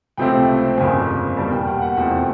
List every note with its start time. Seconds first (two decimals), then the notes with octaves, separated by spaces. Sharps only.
0.17 C#2 C3 F3 A3 C4 G5
0.78 G1 F2 C#3 F3 A#3 G#5
1.37 E2 B2 G3 A#3 A5
1.52 G5
1.67 F#5
1.82 F#5
1.97 F1 E2 C3 F3 A3 G5